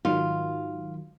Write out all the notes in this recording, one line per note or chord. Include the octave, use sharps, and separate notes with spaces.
G#2 D#3 F#3 F4